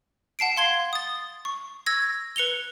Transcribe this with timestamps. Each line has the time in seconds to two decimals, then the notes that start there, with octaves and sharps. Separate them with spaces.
0.39 F#5 A5 C7 D7
0.57 F5 C6 G#6 G7
0.93 D#6 A6
1.45 C#6
1.86 E6 G#6 A#6
2.36 B4 C#7 F7 G7